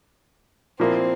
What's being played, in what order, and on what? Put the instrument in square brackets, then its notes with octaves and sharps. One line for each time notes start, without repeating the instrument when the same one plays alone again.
[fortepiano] A#2 F3 A#3 E4 [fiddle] C4